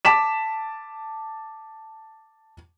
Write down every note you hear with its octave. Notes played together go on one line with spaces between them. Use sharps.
A5 D6 B6 E7